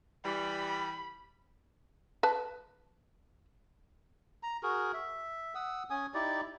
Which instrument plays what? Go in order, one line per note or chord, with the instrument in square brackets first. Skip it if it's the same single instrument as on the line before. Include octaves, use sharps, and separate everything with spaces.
[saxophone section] E3 G3 [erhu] B5
[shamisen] B4 A5
[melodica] A#5
F#4 G#4 A#4
E5
F#5 D#6 E6
C#4 G#5 D#6
D#4 E4 G4 D5